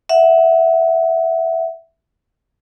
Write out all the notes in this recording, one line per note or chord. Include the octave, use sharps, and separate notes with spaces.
E5 F#5